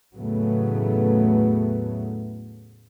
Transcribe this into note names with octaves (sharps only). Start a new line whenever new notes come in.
E2 A2 C#3 F#3 A3 B3